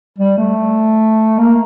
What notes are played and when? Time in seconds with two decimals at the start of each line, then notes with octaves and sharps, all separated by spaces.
0.18 G3
0.38 A3
1.38 A#3